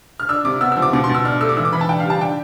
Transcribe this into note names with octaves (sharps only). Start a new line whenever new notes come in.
F6
D4 E6
C3 D6
B3 E6
F3 E6
D6
B2 D6
C6
B2
E6
D4 F6
A3 E6
D6
E3 E6
D6
E3 B5
A5
D4 G5
F5
G3 A5
D4 G5